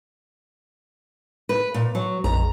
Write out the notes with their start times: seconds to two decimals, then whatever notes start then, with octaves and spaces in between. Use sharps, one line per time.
1.49 B4
1.74 A#2
1.95 F#3
2.24 A#1 F2 A#5